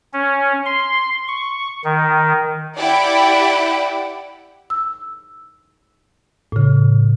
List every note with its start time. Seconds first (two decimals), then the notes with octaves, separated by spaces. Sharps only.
0.13 C#4
0.66 C6
1.28 C#6
1.85 D#3
2.78 E4 G4 D5 F#5 G5
4.70 E6
6.52 A2 C#3